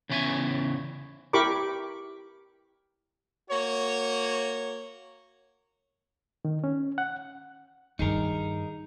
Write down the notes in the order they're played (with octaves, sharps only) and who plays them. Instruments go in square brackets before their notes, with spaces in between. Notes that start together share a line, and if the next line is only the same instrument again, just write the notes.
[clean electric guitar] E2 C#3 E3 C#5 E5 G#5
[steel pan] E4 G4 A#4 B5 C#6 D6
[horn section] A#3 F#4 C#5
[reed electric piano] D#3
C#4
F#5
[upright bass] G2 D#3 [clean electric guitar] D#4 G#4 A#4